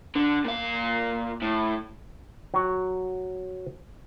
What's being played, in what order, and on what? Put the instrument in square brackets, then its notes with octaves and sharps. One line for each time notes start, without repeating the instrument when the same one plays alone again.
[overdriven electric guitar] D3
A#2 F5
A2
[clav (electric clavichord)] F#3 F#4